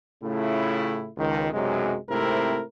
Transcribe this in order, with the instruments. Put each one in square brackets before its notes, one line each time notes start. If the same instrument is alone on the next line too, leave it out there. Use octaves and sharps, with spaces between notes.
[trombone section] A2 C#3 A3 C#4 E4 F4
C#2 D#3
B1 F#2 C3 F#3 G#3
G#2 C3 A3 C4 E4 A#4